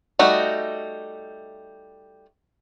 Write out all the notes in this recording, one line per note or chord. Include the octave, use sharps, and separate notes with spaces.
G3 A3 D#4 F#4